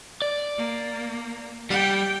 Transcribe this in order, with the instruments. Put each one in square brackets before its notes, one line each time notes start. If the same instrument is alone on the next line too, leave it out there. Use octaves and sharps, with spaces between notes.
[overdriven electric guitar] D5
[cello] A#3
[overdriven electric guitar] G3 [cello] G5